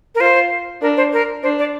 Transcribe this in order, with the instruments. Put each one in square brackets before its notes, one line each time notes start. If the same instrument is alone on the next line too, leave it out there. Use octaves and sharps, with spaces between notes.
[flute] A#4
[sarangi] F4 [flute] C5
[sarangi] D4 [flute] A#4
[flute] C5
A#4
[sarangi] D4 [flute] C5
[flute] D5